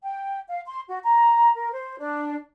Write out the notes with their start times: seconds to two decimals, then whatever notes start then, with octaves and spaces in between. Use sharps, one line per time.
0.03 G5
0.49 F5
0.66 C6
0.88 F#4
1.04 A#5
1.56 A#4
1.72 C5
1.99 D4